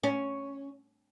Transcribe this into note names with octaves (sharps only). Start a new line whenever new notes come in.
C#4